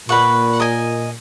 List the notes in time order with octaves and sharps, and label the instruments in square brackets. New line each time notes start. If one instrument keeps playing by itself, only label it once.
[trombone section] A#2 [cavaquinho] B4 F#5 C#6
[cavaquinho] A#4 D#5 G#5